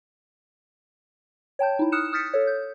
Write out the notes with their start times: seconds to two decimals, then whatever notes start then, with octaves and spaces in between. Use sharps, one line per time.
1.59 C#5 G5 A5 G6
1.79 D#4 E4
1.92 D#6 F6 F#6 C#7 E7
2.13 D#6 F6 G6 A6 B6 C#7
2.34 A4 C#5
2.47 G6